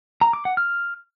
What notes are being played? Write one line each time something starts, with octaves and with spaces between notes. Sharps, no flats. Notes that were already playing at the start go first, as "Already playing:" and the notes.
A#5
D6
F#5
F6